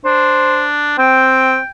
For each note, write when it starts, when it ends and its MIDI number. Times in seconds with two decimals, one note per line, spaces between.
0.05 0.95 62
0.05 0.65 72
0.98 1.57 60
0.98 1.70 79